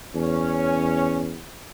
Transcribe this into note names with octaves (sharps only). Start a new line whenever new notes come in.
E2 C#4